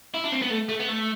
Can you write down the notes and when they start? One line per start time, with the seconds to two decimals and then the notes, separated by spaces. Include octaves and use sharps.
0.14 E4
0.24 D4
0.32 C4
0.42 B3
0.50 A3
0.69 A3
0.80 B3
0.88 A3